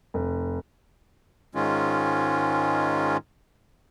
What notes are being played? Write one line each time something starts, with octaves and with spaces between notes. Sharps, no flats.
F1
G#2 D#3 G#3 C#4 F4